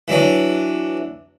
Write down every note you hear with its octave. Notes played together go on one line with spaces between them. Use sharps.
E3 F#3 D4